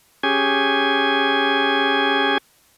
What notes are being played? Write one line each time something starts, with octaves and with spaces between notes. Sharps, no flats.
C#4 G4 G#4 G#5